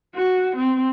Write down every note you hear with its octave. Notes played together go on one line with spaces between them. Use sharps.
F#4
C4